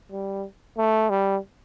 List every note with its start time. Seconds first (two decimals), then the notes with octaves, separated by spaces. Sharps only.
0.12 G3
0.78 A3
1.10 G3